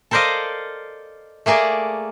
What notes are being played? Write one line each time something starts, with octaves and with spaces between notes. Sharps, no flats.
A4 A#4 C5 D5 D#5 F5
A3 A#3 G#4 A#4 D5